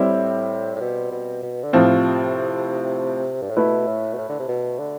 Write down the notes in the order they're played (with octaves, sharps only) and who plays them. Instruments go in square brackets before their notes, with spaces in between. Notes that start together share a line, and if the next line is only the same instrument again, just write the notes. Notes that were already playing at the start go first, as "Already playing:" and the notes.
Already playing: [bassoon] A2 [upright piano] G3 C4 E4
[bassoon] A2
B2
B2
B2
D3
[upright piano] A2 F3 C4 F4 [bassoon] C3
[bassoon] G2
A2
[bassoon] B2 [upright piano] A3 E4 B4
[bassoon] A2
B2
A2
D3
C3
B2
D3